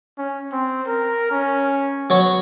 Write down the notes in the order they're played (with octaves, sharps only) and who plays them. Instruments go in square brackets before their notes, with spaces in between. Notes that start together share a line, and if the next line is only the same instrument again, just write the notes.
[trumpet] C#4
C4
A#4
C#4
[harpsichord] F#3 C#5 [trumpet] B3